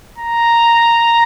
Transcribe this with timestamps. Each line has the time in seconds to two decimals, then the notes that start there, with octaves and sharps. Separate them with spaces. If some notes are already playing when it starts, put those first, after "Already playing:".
0.18 A#5